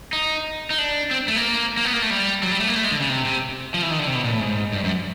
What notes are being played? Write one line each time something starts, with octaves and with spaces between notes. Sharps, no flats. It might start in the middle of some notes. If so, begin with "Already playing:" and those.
D#4
D#4
D4
C4
A3
A#3
A#3
B3
A#3
A3
G3
F#3
G3
A3
A#3
A3
G#3
D3
C#3
C3
C3
F3
E3
D#3
D3
C3
B2
A#2
A2
G#2
G2
F#2